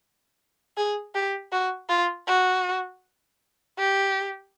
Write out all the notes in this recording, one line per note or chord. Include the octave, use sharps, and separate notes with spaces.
G#4
G4
F#4
F4
F#4
G4